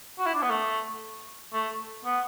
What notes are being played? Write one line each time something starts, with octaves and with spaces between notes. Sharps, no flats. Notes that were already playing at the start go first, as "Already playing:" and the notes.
F#4
E4
D4
B3
A3
A3
B3